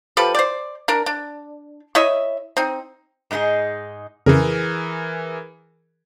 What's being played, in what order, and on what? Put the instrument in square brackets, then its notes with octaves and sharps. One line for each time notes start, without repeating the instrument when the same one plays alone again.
[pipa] F3 G4 A4 B4
C5 D5
D4 A#4
D4
E4 C#5 D#5 E5
C4 D#4
[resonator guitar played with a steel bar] G#2 G#3 A3 D#4 G#4
[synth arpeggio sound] F2 C#3 [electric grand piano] E3 G#4 A#4